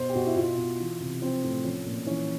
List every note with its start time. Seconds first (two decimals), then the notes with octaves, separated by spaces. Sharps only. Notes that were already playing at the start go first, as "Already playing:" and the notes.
Already playing: B2 C5
0.09 G4
0.15 B2 F#4
0.27 E4
0.36 B2 F4
0.57 B2
0.79 E3
1.00 C3
1.22 F3 C4
1.43 A2
1.64 F3 C#4
1.86 A#2
2.07 E3 C#4